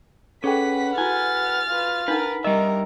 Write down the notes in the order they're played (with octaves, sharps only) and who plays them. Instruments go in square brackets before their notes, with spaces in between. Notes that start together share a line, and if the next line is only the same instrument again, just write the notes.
[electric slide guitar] C#4 [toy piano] G#4 A4 G5 [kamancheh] B4 F#5 [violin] B6
[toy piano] E4 F#4 [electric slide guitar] G#5 [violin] F6 A6
[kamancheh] F4 B4
[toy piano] D4 D#4 F#5 [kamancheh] A#4 [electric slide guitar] B4
[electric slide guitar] G3 E5 [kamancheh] A#4 [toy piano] D#5